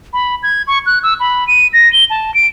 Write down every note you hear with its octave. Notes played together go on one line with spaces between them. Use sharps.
B5
G#6
C#6
F#6
E6
B5
D#7
A#6
G7
A5
D7